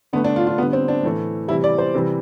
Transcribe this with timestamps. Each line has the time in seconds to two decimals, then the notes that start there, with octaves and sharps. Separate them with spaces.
0.13 D3 A3 B3
0.24 D4
0.36 F4
0.47 F4
0.58 D3 G3 B3
0.73 C4
0.88 D4
1.03 A2 E3 A3
1.48 C3 E3 G3 E4
1.64 D5
1.78 C5
1.94 C3 E3 G3